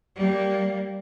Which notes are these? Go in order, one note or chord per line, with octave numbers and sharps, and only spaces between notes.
G3 A#3